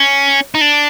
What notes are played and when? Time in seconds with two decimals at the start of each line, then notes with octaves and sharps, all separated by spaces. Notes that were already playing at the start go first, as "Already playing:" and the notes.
Already playing: C#4
0.55 D#4
0.61 D4